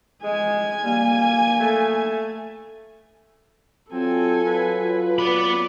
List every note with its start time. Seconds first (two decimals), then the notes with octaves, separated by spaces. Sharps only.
0.24 G#3 G#5
0.84 G3 A#3
1.60 A3
3.92 F#3 C4 F4 A4 G#5
4.47 B4
5.19 B3 D5 B5